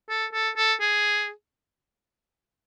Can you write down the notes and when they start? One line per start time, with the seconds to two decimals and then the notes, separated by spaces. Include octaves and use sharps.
0.09 A4
0.33 A4
0.57 A4
0.81 G#4